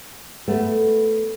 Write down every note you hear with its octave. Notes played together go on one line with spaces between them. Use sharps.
A3 B3